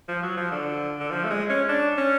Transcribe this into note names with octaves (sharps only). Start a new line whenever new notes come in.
F3
F#3
F3
D3
D3
F3
A3
G#3
C#4
D4
C#4